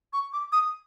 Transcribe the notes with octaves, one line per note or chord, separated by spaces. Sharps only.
C#6
D6
D#6